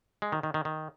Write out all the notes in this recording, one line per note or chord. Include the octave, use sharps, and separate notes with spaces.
G#3
D#3
D#3
D#3
D#3